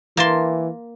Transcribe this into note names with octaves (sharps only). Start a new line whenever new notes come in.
E3 A#3 A5 C6